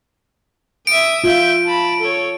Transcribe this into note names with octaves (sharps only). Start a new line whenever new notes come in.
E5 D#6 D7
F4 E5 G6
A5 B5
A4 C#5